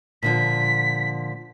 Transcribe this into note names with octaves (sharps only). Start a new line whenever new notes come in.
A#2 D3 F3 B6